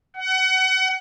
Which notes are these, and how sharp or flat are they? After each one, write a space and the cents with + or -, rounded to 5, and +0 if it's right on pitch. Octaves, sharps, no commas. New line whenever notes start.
F#5 +25